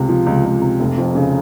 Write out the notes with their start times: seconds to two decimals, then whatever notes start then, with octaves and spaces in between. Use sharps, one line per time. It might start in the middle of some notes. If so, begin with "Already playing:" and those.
Already playing: C#2 C3
0.09 F3
0.26 C#2
0.45 C#2
0.62 C3
0.80 F1
0.97 F2
1.15 C#3